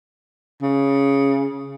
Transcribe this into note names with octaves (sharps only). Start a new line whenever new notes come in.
C#3